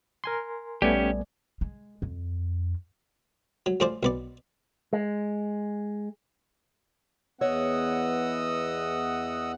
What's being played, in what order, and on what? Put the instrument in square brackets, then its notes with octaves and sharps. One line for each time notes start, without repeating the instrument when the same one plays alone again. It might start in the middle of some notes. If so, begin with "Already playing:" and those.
[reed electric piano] A#4 G#5 C6
[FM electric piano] A#1 G3 D5 [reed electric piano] A3 B3 G#5 [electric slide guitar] C#4 G4
[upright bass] G#3
F2
[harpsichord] F#3
A2 F3 G#4 C5 D5
B1 B3 D5
[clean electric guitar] G#3
[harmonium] E2 F#5 [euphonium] B3 [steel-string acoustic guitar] C#5 [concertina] D#5 D#6 E6